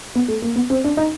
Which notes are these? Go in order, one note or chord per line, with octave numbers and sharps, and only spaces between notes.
B3
A3
A#3
B3
C4
D4
D#4